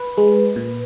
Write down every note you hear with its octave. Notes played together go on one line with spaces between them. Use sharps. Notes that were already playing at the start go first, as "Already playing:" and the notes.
Already playing: B4
G#3
A#2